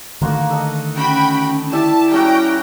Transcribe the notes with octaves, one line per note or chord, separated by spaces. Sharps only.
D3 D#3 A3 A#3 F#4
A4 D#5
C#4 F#4 G5 B5
E4 G4 D5 E5 A5
G3 C#4 F#4 G5 A#5